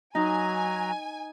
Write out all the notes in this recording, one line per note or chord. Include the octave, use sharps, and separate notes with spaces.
F#3 D#4 G#5 A#5